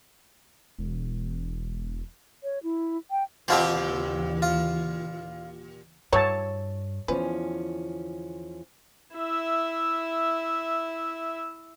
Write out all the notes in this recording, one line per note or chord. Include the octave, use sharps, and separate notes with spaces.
E1
C#5
E4
G5
D#2 A#2 C#3 E3 C4 F4 G4 C5
F4
G2 E3 F#3 A3 C#5 A5
E2 D3 F3 C#4 B4
E4 E5